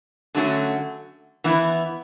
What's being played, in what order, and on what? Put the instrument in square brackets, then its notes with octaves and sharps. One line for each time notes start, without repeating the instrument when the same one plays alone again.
[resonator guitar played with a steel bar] D3 F#3 A3 C#4 F#4
E3 B3 E4